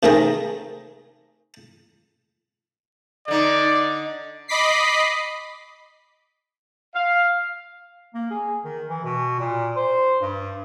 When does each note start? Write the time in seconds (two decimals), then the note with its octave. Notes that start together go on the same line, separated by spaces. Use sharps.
0.03 C3 D#3 A3 C4 G#4 A#4
3.28 D3 D#4 D5
4.48 D#5 B5 D6 B6 C7
6.94 F5
8.14 A#3
8.30 G#4
8.64 D#3
8.89 E3
9.04 B2
9.39 A#2
9.76 C5
10.21 G2